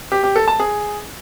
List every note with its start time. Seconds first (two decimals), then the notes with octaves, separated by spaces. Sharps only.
0.12 G4
0.24 G4
0.36 A4
0.48 A5
0.59 G#4